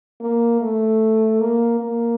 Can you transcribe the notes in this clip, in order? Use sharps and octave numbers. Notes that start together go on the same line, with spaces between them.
A#3
A3
A#3
A#3